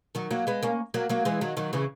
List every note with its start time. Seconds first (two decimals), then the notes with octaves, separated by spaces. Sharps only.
0.15 D#3 F#3
0.31 F#3 A#3
0.47 G#3 B3
0.63 A#3 C#4
0.94 F#3 A#3
1.09 F#3 A#3
1.25 E3 G#3
1.41 D#3 F#3
1.57 D#3 F#3
1.73 C#3 E3